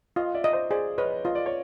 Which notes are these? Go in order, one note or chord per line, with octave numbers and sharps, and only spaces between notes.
F4 D#5 F5
D5 E5
D#5
C5 D5
G#4 C5 D5
B4 C#5 D#5
F4 D#5
D5
C#5